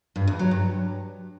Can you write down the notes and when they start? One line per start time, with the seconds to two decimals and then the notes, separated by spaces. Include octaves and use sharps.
0.16 G2
0.27 E2
0.39 F#3
0.51 G2